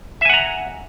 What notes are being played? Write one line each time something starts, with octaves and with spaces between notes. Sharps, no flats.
E5 F#5 G#5 A#5